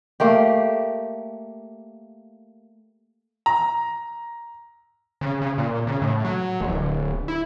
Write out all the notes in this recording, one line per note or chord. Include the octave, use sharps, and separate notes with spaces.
A3 A#3 G4
A#5
C#3
C#3
A#2
C#3
A2
F#3
D1
E4